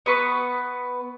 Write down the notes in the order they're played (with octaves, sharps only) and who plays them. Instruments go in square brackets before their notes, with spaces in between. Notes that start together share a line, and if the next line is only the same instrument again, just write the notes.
[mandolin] B3 B4 C#6 D#6